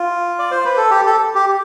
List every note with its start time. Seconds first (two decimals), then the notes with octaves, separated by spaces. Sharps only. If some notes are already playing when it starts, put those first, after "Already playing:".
Already playing: F4
0.39 D5
0.51 C5
0.65 B4
0.77 A4
0.91 G4
1.06 A4
1.35 G4